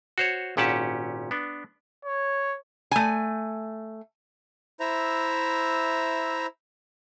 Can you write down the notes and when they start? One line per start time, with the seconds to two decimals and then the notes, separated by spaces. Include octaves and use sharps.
0.18 F#4 C5 C#5
0.57 G#1 A#2 C#4 G4 F#5 A5
1.31 B3 D4
2.05 C#5
2.91 A3 G#5
4.80 E4 C5 E5 A#5